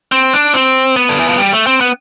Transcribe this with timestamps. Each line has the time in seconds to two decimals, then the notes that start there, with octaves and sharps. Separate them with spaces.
0.12 C4
0.33 D4
0.54 C4
0.96 B3
1.09 D3
1.19 E3
1.29 F3
1.38 G3
1.53 A3
1.67 C4
1.81 B3